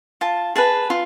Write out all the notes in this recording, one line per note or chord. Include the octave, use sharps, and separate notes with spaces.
F4 A5
G#4 B4 A5
F4